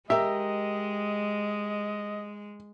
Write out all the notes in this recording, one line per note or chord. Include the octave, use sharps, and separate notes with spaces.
G#3 G4 A#4 D#5 E5